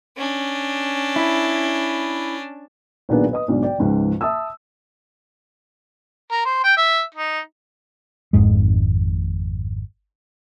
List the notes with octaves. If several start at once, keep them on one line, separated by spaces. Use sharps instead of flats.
C#4 D4
E4
B1 A#2 D#3 B3 D4 G#4
B4 D#5 D#6
B1 G#2 D3 D5
D5 G5
C#2 G#2 F3
E5 A5 D#6 E6
A#4
C5
G5
E5
D#4
G#1 F2 G#2 G#3